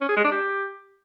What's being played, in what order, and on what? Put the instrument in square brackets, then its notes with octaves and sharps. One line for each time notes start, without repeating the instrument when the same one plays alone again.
[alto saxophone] C#4
G#4
G#3
D4
G4